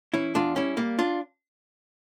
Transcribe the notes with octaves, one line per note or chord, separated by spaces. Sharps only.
E3 C#4 E4
E2 D4 F4
G3 C#4 E4
G3 A#3
D4 F4